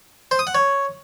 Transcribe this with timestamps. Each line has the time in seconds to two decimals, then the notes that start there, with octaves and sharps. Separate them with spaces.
0.31 C5
0.39 D#6
0.47 F#5
0.55 C#5